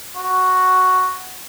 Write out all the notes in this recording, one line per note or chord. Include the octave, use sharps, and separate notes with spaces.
F#4